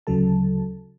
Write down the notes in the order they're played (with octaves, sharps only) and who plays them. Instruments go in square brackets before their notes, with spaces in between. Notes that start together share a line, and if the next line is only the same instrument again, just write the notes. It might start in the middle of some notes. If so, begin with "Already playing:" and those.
[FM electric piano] D2 C#3 F#3 A4 A5